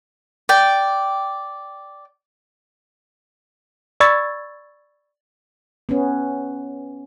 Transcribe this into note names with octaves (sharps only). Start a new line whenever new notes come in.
D5 G5
D5 B5 C#6 E6 G#6 A6
B3 C#4